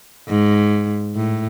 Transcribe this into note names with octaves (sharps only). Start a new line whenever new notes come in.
G#2
A2